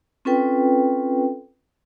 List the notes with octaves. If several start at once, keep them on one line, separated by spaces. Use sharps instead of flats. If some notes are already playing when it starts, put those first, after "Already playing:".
C4 C#4 F4 A4 B4 G5